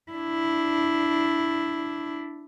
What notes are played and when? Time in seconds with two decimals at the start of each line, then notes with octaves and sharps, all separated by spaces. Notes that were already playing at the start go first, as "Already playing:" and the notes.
0.12 D4 E4